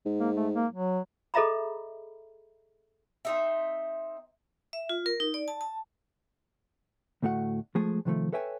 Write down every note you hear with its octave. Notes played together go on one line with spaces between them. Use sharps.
G#2
A#3
A3
A#3
F#3
G#4 A4 D#5 E5 A#5 B5
C4 D#4 E5
E5
F4
A#4
D#4
D5
A5
A5
D2 A2 A3 F#4 F#5
F3 G#3 A3 G#4
C3 D#3 F3 A3
A4 B4 C#5 E5 G5 G#5